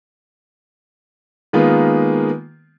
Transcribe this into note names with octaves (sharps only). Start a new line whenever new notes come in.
D#3 G#3 A#3 B3 F4